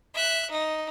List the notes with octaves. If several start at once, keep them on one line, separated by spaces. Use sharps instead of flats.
E5 F#6
D#4